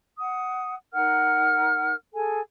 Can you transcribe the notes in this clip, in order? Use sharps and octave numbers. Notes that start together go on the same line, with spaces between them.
F#5 D#6
D#4 A#4 F#5 F6
G#4 A4 G#5